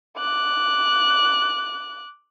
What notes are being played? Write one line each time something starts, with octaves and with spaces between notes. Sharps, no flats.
D6 F#6